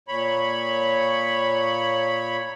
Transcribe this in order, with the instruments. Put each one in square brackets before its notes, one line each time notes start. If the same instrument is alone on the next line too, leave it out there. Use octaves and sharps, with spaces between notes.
[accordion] A#2 C#5 B5